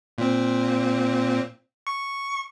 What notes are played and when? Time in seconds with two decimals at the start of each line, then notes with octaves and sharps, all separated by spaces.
0.18 A#2 C4
1.87 C#6